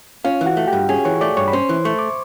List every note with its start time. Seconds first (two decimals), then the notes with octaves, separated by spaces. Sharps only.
0.24 C#4 F4 F5
0.41 E3
0.46 F#4 F#5
0.57 A3
0.68 G4 G5
0.73 G2
0.89 C#4 G#4 G#5
1.05 E3 C#5 C#6
1.21 A3 D5 D6
1.37 G2 C#5 C#6
1.48 B5
1.53 C#4 C5 C6
1.69 E3
1.85 A3 C#6
1.99 D6